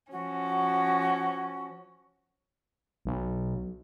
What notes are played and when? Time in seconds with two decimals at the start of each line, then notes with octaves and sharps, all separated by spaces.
0.11 F3 C#4 F#4
3.05 B1